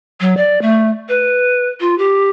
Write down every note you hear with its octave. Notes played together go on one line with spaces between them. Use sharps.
F#3
D5
A3
B4
F4
G4